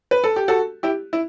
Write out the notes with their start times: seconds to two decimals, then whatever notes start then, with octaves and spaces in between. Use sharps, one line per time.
0.11 B4
0.24 A4
0.36 G4
0.48 F#4 A4
0.83 E4 G4
1.13 E4